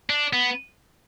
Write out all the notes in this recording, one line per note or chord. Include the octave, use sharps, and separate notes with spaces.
D4
B3